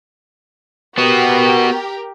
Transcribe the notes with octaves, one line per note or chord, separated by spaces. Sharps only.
B3 F#4 G4 A#4